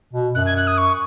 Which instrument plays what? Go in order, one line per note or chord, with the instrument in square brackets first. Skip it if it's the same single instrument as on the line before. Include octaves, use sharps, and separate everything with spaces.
[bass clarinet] B2
[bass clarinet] F#2 [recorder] F#6
[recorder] G#6
F#6
D#6
C#6